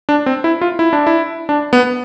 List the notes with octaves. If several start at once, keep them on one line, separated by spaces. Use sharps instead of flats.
D4
C4
E4
F4
E4
D4
E4
D4
B3